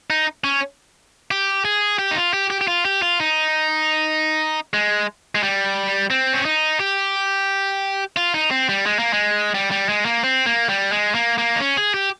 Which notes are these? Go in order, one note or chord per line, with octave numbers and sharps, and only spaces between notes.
D#4
C#4
G4
G#4
G4
D#4
F4
G4
G4
G4
F4
G4
F4
D#4
G#3
G#3
G3
C4
C#4
D#4
G4
F4
D#4
C4
G3
G#3
A#3
G#3
G3
G3
G#3
A#3
C4
A#3
G3
G#3
A#3
A#3
D#4
C#4
G#4
G4